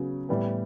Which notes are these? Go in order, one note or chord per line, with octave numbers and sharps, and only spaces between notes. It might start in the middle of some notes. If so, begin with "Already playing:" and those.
Already playing: C#3 F#3 B3
A2 E3 G3 B3